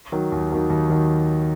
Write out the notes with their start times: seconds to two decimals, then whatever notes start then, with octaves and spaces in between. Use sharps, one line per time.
0.12 D#3 F#3
0.32 D#2
0.52 D#3 F#3
0.70 D#2
0.90 D#3 F#3